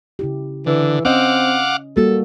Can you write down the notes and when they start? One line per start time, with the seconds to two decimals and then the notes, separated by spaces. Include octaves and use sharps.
0.19 C#3 E4 G4
0.66 D3 E3
1.05 C4 C#4 D#5 F5 F#5 D6
1.97 G3 A#3 F#4 A4